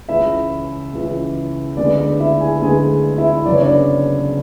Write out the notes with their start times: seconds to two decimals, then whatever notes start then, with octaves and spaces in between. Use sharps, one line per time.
0.09 C#2 C#3 E3 E4 E5
0.93 C#2 C#3 E3
1.77 D2 D3 G#3 B3 D4 D5
1.99 D4 D5
2.20 E4 E5
2.41 G#4 G#5
2.62 D2 D3 G#3 B3 G#4 G#5
3.18 E4 E5
3.46 F#1 F#2 C#3 F#3 B3 D5
3.55 C#5
3.62 D4 D5